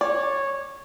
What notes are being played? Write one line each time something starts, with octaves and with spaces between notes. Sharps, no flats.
C#5 D5